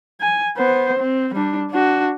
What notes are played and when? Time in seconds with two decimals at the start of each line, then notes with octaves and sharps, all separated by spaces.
0.21 G#5
0.56 B3 C5
0.99 C4
1.34 G3 D4
1.71 D4 F#4